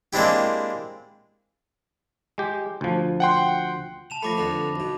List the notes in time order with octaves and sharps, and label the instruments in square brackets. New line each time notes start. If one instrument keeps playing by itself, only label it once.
[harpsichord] G#3 A#3 C4 D4 E4 G4
[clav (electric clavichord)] G#3 G4
D2 F3
[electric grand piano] F#5 G5 C6
[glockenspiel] A5 E7 F7
[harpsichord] F3 A3 [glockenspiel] B5 D6 A#6
[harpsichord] F2 D3 B3
B1 B2